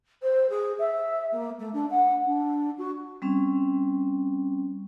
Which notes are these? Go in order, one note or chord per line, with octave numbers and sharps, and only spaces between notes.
C5
G#4
E5
A#3
A3
D4
F#5
D4
F#4
G3 C4 C#4